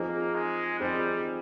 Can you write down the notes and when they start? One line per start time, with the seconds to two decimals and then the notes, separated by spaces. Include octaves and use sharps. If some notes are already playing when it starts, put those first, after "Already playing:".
Already playing: F3 A#3 C4 D#4 G#4
0.35 G#3
0.79 F3 G3 C4 D#4 G#4